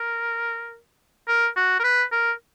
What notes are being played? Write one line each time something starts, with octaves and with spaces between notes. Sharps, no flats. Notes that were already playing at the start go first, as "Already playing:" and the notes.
Already playing: A#4
A#4
F#4
A#4
B4
A#4